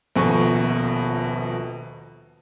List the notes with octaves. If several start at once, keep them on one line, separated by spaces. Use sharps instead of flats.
D#1 A#1 B2 A4 G#5 C#6